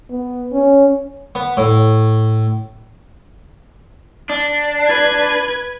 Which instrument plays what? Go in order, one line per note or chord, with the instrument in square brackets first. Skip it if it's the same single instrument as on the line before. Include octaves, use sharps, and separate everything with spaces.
[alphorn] B3
C#4
[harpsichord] B3
A2
[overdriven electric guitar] D4
[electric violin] B4 G#6